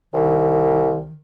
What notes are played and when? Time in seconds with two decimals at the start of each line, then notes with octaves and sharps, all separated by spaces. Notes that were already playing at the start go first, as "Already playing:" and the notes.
0.13 C2 D#3